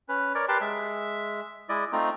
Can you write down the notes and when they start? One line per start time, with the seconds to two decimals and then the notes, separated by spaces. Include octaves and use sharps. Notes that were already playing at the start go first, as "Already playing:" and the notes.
0.09 C#4 B4
0.35 A#4 C#5 D5
0.49 G4 A#4 B4 G5 A5 C6
0.61 G#3 E5
1.69 G#3 E4 D5 D#5
1.93 A3 C4 D#4 F4